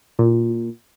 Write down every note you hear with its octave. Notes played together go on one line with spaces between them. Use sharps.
A#2